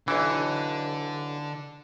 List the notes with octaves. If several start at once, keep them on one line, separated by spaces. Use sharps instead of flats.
B1 D3 E3